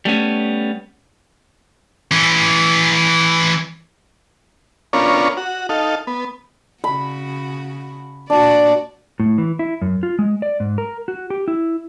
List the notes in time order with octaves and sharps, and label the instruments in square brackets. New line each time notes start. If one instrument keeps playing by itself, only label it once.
[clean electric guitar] G3 A3 B3 C#4
[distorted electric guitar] E3 C#4
[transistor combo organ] B3 C#4 D4 F4 A#4 C#5
F#4
D#4 A4 F5
B3
[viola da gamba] C#3 F#4 [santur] B5
[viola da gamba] A#2 F#4 D5 [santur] D4
[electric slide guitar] A2
E3
E4
F#2
F4
G#3
D5
G#2
A#4
F#4
G4
E4